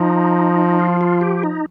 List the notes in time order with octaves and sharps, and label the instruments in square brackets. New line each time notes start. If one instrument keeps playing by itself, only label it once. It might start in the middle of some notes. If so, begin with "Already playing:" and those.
Already playing: [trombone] F3 [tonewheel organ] D#4
[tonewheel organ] F4
F4
G4
D#4